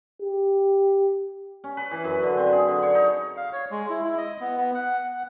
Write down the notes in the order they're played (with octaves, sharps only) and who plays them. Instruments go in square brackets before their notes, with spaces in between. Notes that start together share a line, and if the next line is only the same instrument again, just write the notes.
[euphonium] G4
[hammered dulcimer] C#4
B4
E3
F#2
D3
C4
G#4
D3
C#5
D#4
[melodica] F5
C#5
G#3
E4
E4
D#5
B3
B3
F#5